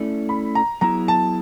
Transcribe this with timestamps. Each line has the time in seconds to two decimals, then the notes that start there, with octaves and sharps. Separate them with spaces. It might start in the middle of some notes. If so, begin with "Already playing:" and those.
Already playing: A3 C#4 E4 A4 D5
0.29 B5
0.55 A#5
0.81 F#3 B3 E4 G#4 A#5
1.08 A5